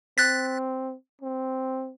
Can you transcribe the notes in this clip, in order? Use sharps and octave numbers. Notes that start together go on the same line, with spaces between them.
C4 F#6 A6 B6
C4